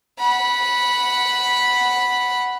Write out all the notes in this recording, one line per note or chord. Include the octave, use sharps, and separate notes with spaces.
F#5 B5